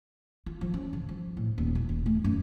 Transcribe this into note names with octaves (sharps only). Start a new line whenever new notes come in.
F4
F3
C#4
C#3
F3
A2
D#1
E4
D#1
A3
F#2